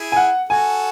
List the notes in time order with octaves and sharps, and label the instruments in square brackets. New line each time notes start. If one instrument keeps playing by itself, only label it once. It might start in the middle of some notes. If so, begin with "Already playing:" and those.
Already playing: [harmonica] E4 G#4
[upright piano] G#5
F#5
[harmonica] F#4 A4 [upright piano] G#5